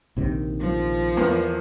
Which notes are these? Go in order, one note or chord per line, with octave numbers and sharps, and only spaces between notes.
A#1 C3 D#3
F3
E2 A#3 B3